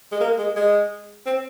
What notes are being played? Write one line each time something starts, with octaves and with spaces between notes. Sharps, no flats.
G#3
A#3
G#3
G#3
C4